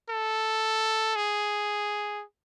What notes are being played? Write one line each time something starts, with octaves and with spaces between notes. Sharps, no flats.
A4
G#4